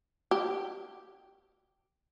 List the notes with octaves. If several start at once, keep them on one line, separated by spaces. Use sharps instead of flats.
G4